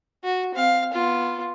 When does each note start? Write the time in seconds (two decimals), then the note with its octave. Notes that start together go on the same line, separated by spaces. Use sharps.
0.24 F#4
0.55 C4 F5
0.93 B3 F4